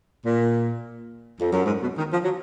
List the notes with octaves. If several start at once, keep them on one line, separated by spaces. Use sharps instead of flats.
A#2
F2
F#2
G#2
B2
D#3
F3
F#3